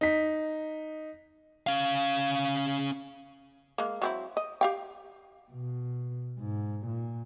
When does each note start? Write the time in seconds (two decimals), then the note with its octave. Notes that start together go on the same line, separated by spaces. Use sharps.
0.01 D#4 B6
1.67 C#4 F5
3.78 G#3 A#3
4.02 F#3 C4 E4
4.37 D#5
4.61 G4 F5 G5
5.52 B2
6.40 G#2
6.87 A#2